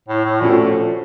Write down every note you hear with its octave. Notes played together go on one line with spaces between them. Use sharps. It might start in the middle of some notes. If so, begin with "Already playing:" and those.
A2
A2
A#2 F3 A3 C#4 F#4 A4